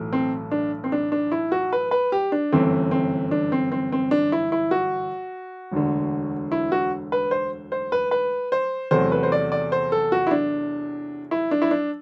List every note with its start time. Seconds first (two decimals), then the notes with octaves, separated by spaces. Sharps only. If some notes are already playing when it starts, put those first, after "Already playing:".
Already playing: B1 A2 E3 A3
0.13 C4
0.51 D4
0.84 C4
0.92 D4
1.12 D4
1.32 E4
1.52 F#4
1.73 B4
1.91 B4
2.12 G4
2.32 D4
2.53 G1 F#2 E3 A3 C4
2.91 C4
3.31 D4
3.52 C4
3.72 C4
3.92 C4
4.11 D4
4.32 E4
4.52 E4
4.71 F#4
5.72 E1 D2 D3
6.52 E4
6.72 F#4
7.12 B4
7.31 C5
7.72 C5
7.92 B4
8.11 B4
8.52 C5
8.91 E2 C3 F#3 A3 C5
9.12 B4
9.23 C5
9.32 D5
9.52 D5
9.72 C5
9.92 A4
10.12 F#4
10.27 E4
10.31 D4
11.31 E4
11.51 D4
11.62 E4
11.71 D4